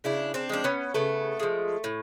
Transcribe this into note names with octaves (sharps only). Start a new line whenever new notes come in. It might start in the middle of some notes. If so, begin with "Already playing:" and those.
C#3 D4 E4
C4 D4
F3 G#3 D4
B3 C#4
C#3 A3 B3
F3 G#3
A2